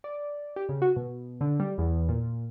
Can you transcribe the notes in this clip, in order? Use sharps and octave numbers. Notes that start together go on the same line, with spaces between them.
D5
G4
C#3
F#4
B2
D3
G3
E2
A#2